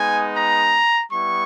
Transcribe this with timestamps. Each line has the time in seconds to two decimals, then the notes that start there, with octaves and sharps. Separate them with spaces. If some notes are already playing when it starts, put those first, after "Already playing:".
Already playing: G#3 B3 D#4 G#5
0.37 A#5
1.12 G3 B3 E4 C#6